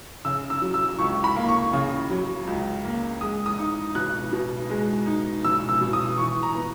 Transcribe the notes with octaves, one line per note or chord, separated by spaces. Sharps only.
C#3 E6
E6
F#3
E6
C#2 C#6
B5
A#3
C#6
C#3
F#3
C#2
A#3
G#3 D#6
D#6
D#4
B2 F#6
B2
G#3
D#4
B2 E6
E6
B2
D#6
E3 C#6
A#5
B3